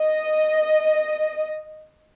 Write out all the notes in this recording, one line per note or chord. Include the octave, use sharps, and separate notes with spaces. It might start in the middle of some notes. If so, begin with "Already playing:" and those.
Already playing: D#5